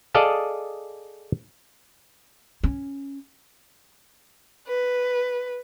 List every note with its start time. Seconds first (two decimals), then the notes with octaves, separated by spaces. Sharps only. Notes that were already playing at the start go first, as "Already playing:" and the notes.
0.14 G#4 A4 D5 D#5 F5 A5
2.63 C#4
4.68 B4